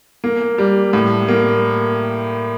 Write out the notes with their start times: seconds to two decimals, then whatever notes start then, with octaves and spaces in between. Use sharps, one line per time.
0.24 A#3
0.58 G3
0.93 A2
1.28 A#3